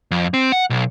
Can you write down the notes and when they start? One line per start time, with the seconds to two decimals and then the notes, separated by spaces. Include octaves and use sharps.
0.11 F2
0.34 C4
0.52 F#5
0.70 B1